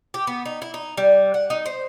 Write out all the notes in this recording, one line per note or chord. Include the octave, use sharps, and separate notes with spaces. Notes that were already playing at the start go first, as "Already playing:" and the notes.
G4
B3
D#4
E4
D#4
G3
F#5
D#4
C5